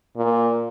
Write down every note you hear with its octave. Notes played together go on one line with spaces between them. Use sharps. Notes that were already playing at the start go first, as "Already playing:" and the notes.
A#2